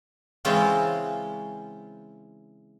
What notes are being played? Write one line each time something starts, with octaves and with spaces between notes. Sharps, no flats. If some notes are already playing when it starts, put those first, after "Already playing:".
C#3 E3 G#3 C4 C#4 F4